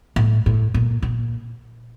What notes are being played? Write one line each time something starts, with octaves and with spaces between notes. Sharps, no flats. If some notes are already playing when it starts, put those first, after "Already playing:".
A2
A2
A#2
A#2